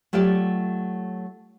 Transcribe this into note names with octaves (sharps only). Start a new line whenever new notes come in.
F#3 A3 F4 G4 D5